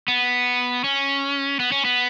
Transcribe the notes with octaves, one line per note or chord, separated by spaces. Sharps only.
B3
C#4
B3
C#4
B3